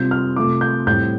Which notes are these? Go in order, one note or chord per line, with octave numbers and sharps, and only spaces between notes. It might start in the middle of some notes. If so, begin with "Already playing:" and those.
Already playing: C3 G3 C4 F4 G6
F6
C3 A3 F4 D6
G6
A2 G3 C4 G6